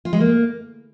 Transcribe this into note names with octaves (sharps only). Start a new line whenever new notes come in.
F4
G#3
A#3